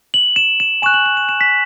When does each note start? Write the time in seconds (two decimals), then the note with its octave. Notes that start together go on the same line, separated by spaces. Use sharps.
0.14 F#7
0.36 E7
0.60 E7
0.82 G#5 C#6 F#6 E7
0.94 F#7
1.06 E7
1.17 E7
1.29 E7
1.41 B6